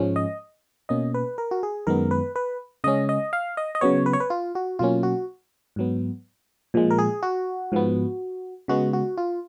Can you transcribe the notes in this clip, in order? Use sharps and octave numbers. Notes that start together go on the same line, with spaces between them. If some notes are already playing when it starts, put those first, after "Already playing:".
Already playing: G#2 F3 G#3 C#4
D#5
B2 A#3 C#4 D#5
B4
A#4
F#4
G#4
F#2 D#3 G#3 B3 A#4
B4
B4
C#3 G#3 C#4 D#5
D#5
F5
D#5
D#5
C#3 F#3 B3 C#5
B4
C#5
B4
F4
F#4
B2 F#3 A#3 C#4 F4
F#4
G#2 F#3 B3
A#2 F3 G#3
A#4
G#4
F#4
G#2 F3 B3
C#3 G#3 B3 F#4
F#4
F4